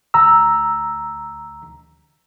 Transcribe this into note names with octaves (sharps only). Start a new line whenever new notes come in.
D2 A#5 E6